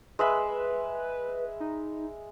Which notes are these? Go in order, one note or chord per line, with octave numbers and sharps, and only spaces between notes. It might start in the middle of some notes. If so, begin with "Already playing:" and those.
G#3 B4 E5 B5
D#4